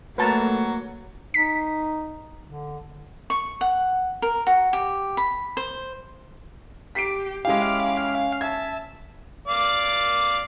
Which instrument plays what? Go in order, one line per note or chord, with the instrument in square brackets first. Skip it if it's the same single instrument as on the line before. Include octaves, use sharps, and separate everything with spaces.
[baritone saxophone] F#3 [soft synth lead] A3 [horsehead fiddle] A#3 [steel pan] B4 A5 A#5
[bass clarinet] D#4 [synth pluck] B6
[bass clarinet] D3
[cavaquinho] C#6
F#5
A#4
F#4
G4
B5
C5
[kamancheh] G4 [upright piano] B6 C7 D7
[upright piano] G#3 E4 G4 [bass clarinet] C#4 [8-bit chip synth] F5 [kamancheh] B5 D6
[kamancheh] E5 A5 [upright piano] G#6
[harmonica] D5 F5 D6